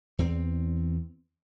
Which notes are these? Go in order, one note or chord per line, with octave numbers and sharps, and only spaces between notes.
E2 C4